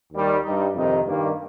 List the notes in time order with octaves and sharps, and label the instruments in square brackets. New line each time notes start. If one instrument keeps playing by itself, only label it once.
[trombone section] D#2 D#3 G3
G2 G3 D#4
F2 C3 D#3 C4 D#4
G2 D#3 G3 A#3